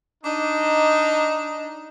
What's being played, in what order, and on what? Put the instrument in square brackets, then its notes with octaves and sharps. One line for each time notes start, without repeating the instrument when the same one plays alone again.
[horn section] D4 D#4 [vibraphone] D#5 D6